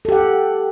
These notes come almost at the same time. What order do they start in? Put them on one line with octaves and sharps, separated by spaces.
A4 G4 F#5